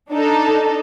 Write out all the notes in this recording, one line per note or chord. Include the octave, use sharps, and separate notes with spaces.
D4 D#4 A4